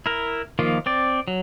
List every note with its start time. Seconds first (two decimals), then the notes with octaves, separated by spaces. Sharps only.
0.06 E4 A#4
0.59 D#3 F3 A#3 F4
0.86 C4 D5
1.28 F#3